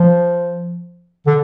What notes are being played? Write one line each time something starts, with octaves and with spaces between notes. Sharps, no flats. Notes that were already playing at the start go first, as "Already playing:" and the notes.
Already playing: F3
D3